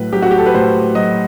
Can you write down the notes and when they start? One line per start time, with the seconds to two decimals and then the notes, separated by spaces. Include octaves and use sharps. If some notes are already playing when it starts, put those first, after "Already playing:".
Already playing: A2 F#3 B4
0.13 F#3 G4
0.23 F#4
0.31 G4
0.38 A4
0.46 B4
0.55 A2 C5
0.95 F#3 D#5